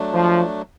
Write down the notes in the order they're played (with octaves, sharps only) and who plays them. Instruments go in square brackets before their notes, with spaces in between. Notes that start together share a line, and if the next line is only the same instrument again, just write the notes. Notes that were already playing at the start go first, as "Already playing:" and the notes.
Already playing: [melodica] F#3 A3 D4
[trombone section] F3